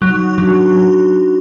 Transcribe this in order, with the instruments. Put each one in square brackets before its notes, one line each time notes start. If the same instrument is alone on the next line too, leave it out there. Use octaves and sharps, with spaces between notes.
[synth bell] F#3 [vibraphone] D#4
[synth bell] F#3 [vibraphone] D4 F#4